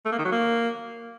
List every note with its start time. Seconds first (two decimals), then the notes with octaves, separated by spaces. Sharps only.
0.05 A3
0.12 A#3
0.19 D#3
0.25 F#3
0.32 A#3